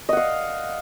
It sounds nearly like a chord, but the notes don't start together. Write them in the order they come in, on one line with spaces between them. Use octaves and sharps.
D#5 F#5 F5